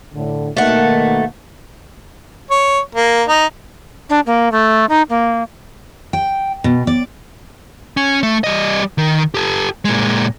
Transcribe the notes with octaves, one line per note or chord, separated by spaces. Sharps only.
A2 D3
B2 D#3 A3 A#3 F#5
C#5
A#3
D#4
D4
A#3
A3
D#4
A#3
G5
B2
D5
C#4
A3
G3 D#5
D#3
G4 A4
A#2 G#3